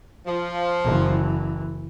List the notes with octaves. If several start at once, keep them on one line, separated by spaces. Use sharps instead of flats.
F3
F#1 E3